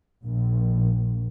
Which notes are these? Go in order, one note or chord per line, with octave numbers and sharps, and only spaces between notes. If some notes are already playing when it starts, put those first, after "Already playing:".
A#1